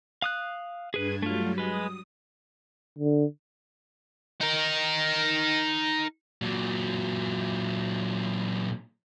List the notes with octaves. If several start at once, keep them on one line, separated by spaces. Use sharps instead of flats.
F5 D#6 F#6
G2 D4 G#4 B4 G#6
F#3 G3 A3 F4
G#3 B4 D#6
D3
D#4 A#4
A#2 F#3